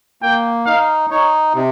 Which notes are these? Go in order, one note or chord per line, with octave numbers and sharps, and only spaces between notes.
A#3 G5
D#4 F5
D#4 C#5
C3